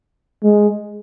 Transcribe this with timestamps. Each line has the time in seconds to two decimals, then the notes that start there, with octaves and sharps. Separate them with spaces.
0.43 G#3